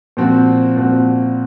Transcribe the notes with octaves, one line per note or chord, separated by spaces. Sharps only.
A#2 F3 C4 F#4
A#2 F3 C4 F#4